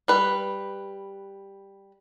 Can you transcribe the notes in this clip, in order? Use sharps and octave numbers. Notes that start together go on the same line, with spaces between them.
G3 B4